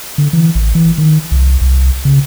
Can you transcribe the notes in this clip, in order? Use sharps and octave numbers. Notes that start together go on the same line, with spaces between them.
D3
E3
A1
E3
D#3
C2
C2
C#3